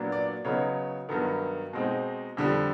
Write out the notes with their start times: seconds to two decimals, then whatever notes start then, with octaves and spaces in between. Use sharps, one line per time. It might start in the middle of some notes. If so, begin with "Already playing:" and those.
Already playing: A#2 F#3 B3 D4
0.12 D5
0.45 C#3 F#3 B3 D#4 C#5
1.09 G2 D#3 F#3 B3
1.73 B2 G#3 C4 D#4
2.37 F2 D3 G3